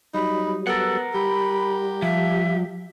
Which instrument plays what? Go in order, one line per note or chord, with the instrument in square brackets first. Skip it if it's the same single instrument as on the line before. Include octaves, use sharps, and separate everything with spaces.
[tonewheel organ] F#3 G3 [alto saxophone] D#4 [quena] B5
[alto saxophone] B3 [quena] A4 [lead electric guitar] A#4 F#5
[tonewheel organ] G3 [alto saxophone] G4 [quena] B5
[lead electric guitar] F3 [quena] E5